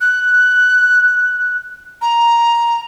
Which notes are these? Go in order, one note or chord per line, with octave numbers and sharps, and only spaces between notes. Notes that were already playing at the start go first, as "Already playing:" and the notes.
F#6
A#5